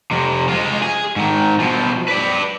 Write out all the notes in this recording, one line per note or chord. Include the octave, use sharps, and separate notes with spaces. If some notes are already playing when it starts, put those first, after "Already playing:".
F2 C3
G#3 F4
G#4
G#2 D#3
B2 F3
B4 D5